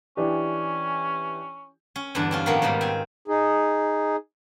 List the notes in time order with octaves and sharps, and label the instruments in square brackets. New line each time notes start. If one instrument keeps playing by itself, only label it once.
[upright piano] E3 D4 G4 [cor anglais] C#4
[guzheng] C#4
E2 G2 D3 D4
C4 C#4 F4
A2 D#3 F3 A#3 B3
G#2 B2 D#3 G3 B5
C4 G#5
[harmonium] D#4 G#4